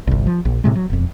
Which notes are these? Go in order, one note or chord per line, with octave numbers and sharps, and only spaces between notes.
G1 C2
F3
A#1
A2 C3 G#3
F#3
E1 F2